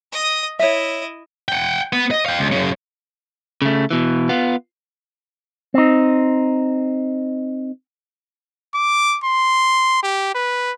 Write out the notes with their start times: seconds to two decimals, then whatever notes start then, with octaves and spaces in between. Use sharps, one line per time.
0.12 D#5 D#6
0.59 E4 C#5 D#5 E5
1.48 F#5 G5
1.93 B3
2.11 D#5
2.26 F5 G5
2.39 C#2
2.52 F#2 C#3
3.62 C#3 A3
3.91 B2 E3
4.29 B3 F4
5.74 C4 D#4
8.75 D6
9.24 C6
10.03 G4
10.35 B4